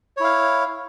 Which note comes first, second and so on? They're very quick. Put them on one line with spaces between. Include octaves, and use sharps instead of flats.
C#5 E4 F5